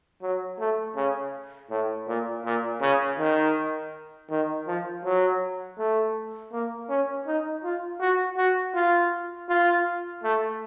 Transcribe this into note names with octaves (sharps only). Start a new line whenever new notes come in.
F#3
A3
C#3
A2
A#2
A#2
C#3
D#3
D#3
F3
F#3
A3
A#3
C#4
D#4
F4
F#4
F#4
F4
F4
A3